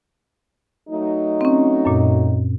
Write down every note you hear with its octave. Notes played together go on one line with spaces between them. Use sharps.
F#3 A3 D#4
C4 C#4
F#2 A#2